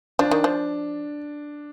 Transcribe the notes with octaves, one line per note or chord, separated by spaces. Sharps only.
F3 D4
D#3
F3